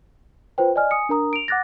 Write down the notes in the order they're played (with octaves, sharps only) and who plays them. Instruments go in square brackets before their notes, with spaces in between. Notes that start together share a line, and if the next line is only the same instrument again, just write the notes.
[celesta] F4 B4 C5 G5
D5 D#5 G#5 F6
G#5 D#6 C#7
D4 A#4 A#5 D#6
D7 F7
F#5 D6 F#6 A6 A#6